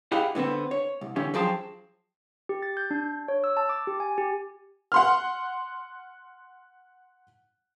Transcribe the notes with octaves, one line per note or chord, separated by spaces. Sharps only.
E4 G4 G#4 D#5 F5 F#5
A2 D3 B3 C4
C#5
C2
D3 E3 C#4 G4
F3 F#3 G#4 G5 A5 C6
G4
A6
G6
D4
C#5
E6
A5
D6
G4
G#5
G4
F#5 C6 F6